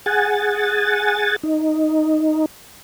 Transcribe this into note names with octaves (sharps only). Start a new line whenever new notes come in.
G#4 F#5 G#5 A6
D#4